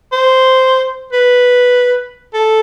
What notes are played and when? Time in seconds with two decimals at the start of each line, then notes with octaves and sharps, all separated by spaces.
0.12 C5
1.13 B4
2.34 A4